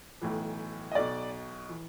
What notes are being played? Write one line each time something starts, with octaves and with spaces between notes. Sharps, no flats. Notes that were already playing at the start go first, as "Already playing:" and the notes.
B1 A2 E3
D#5
B1 B2 D5
E3